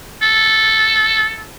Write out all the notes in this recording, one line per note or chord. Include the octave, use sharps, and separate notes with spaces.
A4